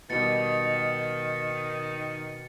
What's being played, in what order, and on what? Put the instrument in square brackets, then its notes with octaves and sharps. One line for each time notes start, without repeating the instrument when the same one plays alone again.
[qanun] B2 G3 [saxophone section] D#3 [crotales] A6 C#7